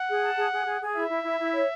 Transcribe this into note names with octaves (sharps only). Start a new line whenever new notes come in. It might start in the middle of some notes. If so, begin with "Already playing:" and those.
Already playing: F#5
G#4
A5
G#4
G#4
G#4
G#4
E4 E5
E4
E4
E4
C#5